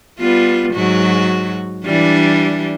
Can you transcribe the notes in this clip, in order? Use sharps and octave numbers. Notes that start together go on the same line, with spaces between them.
G3 B3 F4
G#2 F#3 F#4
E3 G3 D4